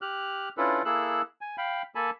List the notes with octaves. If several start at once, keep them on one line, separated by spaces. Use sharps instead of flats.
G4 F6 F#6
C#4 D4 E4 F4 A4 B4
A#3 E4 G#4 A4 E6 F#6
G#5
F5 G5 B5
A#3 A4 G#5 A5 B5